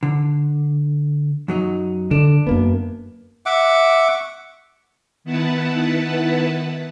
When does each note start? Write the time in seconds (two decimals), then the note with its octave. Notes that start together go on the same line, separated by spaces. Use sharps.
0.03 D3
1.48 F#2 F#3 D#4
2.11 D3 D4
2.47 F#2 A#3 B3
3.46 E5 F#5 D6
4.10 C#6
5.24 D#3 B3 E4 B4 F#5 A5